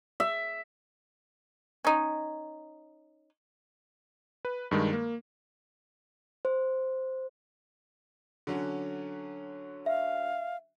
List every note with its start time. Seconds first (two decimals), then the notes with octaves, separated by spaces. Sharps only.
0.20 E5
1.85 C#4 D#4
4.45 B4
4.71 G2 D#3 G#3
4.93 A#3
6.45 C5
8.47 D3 F#3 C#4
9.86 E5 F5